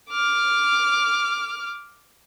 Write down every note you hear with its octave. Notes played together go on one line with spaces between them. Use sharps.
D6 F6